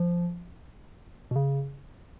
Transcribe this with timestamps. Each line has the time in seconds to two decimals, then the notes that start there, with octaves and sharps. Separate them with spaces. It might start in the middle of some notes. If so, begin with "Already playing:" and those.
Already playing: F3
1.31 B2
1.36 C#3